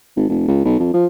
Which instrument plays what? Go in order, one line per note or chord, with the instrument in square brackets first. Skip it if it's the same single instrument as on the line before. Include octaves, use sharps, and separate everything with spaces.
[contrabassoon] G#1
F1
C#2
B1
F2
F3